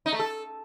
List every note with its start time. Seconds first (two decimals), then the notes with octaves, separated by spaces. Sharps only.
0.06 D#4
0.13 A3
0.19 A4